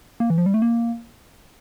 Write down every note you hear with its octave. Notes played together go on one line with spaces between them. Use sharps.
A#3
E3
F3
G3
A3
A#3